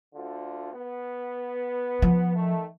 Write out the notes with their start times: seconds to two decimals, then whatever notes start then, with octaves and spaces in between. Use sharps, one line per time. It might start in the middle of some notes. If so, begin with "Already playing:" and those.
0.14 D2 D3 F4
0.74 B3
2.02 F3
2.36 D#3 A3